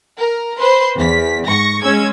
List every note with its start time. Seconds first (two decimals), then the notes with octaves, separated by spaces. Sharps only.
0.19 A#4
0.58 B4 C5 C6
0.96 E2 B6
1.45 G#2 C#6 A#6
1.82 G#3 C#4 E6 G#6